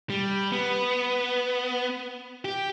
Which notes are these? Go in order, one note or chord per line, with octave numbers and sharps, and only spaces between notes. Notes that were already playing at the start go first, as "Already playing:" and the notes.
G3
B3
G4